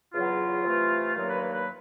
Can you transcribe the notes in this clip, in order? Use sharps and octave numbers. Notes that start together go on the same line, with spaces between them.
E2 C#3 F#3 B3 F4
C3 E3 A3
G2 D#3 F#3 A#3 F4
B4
B4
B4